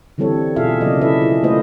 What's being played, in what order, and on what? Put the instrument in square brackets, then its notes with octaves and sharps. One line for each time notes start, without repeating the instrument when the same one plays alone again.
[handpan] D3 E3 G3 C4 A4 C#5
B2 F4 G#4 A4 E5 F5
C#3 F#3 A#3 D5 D#5
E4 A4 B4 E5
E4 F4 G#4
A3 A#3 F4 B4 C5 D#5